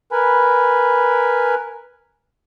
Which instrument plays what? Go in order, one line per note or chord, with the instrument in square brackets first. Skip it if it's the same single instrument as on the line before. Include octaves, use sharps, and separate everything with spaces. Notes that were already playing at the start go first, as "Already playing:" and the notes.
[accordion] A#4 B4 G#5 B5